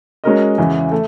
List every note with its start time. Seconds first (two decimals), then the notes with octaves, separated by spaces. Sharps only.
0.24 G#3 C#4 F#4 A#4 D#5
0.58 E2 C#3 E3
0.91 A3